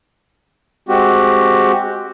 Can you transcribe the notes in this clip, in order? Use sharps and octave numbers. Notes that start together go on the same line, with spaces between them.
G#3 C4 F#4 G4